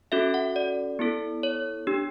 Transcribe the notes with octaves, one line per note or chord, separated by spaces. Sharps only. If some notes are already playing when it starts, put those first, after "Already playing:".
C#4 F#4 A4 E5
F#5
D5
B3 E4 A4
C#5
D4 G4